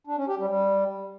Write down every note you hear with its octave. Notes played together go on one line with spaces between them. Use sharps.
D4
C#4
G4
G3
G3